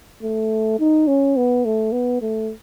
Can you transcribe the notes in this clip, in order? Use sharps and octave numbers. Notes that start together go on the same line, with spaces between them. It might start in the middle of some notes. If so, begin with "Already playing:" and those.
A3
D#4
C#4
B3
A3
B3
A3